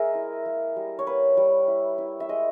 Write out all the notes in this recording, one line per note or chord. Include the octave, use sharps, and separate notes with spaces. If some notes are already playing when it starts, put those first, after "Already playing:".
Already playing: G#3 G#4 A#4 E5
E4
A#3
G3
C#5
A#3 B4
G3
E4
E4
E5
G#3 D#5